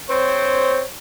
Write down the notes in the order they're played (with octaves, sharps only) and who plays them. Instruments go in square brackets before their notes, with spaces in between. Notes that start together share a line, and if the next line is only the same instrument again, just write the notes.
[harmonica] C4 C5 C#5